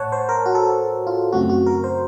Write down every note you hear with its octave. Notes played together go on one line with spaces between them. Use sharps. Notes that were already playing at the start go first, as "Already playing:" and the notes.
Already playing: A2 C#5 F#5 A5
C5
A#4
F#4
A4
F4
F#2 C#3 A3 C4 F#4
F#4
A#4
C5